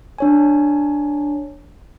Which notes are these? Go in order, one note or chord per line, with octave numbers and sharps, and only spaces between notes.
D4 C#5 G#5